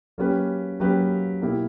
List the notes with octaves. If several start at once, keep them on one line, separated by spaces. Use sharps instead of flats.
F#3 A#3 C#4 G4 B4
F#3 A#3 C#4 G4 B4
B2 A#3 E4 G4